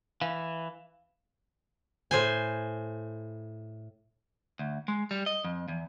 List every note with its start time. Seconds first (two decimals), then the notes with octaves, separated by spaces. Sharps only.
0.21 E3 F5
2.11 A2 C5 G#5
4.59 D2
4.88 G#3
5.11 G3
5.26 D#5
5.44 F2
5.68 E2